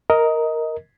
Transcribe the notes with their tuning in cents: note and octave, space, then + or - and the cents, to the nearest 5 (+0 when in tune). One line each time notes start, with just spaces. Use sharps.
A#4 +0 D#5 +15